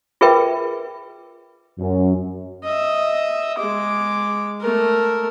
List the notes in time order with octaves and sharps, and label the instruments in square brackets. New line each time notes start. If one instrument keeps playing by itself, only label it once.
[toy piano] F4 G#4 A#4 B4 E5 G5
[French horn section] F#2
[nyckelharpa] D#5 E5
G#3 D6
A3 A#4